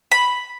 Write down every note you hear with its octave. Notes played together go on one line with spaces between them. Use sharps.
B5